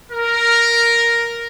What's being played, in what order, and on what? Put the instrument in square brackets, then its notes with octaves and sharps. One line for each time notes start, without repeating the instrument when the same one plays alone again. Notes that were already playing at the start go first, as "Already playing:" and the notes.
[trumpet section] A#4